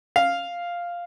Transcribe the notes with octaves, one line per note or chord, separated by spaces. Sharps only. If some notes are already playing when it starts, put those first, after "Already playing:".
F5